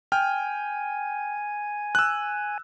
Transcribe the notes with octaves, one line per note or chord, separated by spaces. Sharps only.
G5 G#5 F6
E6 F#6